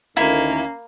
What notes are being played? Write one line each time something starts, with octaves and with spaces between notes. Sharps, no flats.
D2 D#3 A#3 C#4 E4